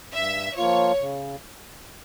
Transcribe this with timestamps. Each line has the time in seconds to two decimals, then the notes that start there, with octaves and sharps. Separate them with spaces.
0.14 G2 E5
0.57 F3 A#3 F4 C#5
1.01 C#3